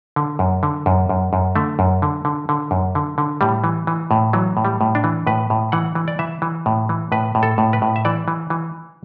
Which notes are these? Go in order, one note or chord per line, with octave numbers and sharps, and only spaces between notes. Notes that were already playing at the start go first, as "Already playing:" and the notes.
D3
F#2
D3
F#2
F#2
F#2
D3 A3
F#2
D3
D3
D3
F#2
D3
D3
A2 G3
E3
E3
A2
E3 F#3
A2
G3
A2
D4
E3
A2 B4
A2
E3 F#5
E3
D5
E3 E5
E3
A2
E3
A2 B4
A2
A4
A2
B4
A2
E5
E3 D5
E3
E3